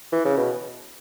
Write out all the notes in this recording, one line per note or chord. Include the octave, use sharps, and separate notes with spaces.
E3
C#3
B2